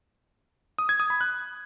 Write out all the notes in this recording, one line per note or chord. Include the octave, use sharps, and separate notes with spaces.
D#6
G#6
D#6
B5
F#6